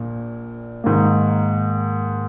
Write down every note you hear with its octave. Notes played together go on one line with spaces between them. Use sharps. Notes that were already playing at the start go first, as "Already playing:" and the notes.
Already playing: A#1 A#2
G#2 D#3 A#3